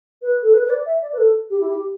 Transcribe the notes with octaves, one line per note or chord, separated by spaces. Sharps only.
B4
A4
B4
B4
D5
E5
D5
B4
A4
G4
E4
G4